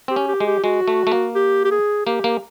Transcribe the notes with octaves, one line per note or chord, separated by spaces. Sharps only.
C4 G4
C#4
G4
G#3
G4
G#3 F#4
A3
A3
A#3
G4
G4
G#4
A#3 G4
A#3